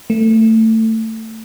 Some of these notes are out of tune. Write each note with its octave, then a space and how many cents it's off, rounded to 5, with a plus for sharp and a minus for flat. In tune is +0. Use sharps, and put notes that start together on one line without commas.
A3 +20